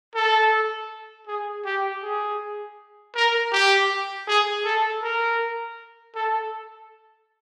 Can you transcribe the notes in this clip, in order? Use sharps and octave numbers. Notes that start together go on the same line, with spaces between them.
A4
G#4
G4
G#4
A#4
G4
G#4
A4
A#4
A4